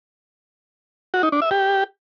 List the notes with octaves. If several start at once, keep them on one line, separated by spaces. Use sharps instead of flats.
F#4
D#4
D4
E5
G4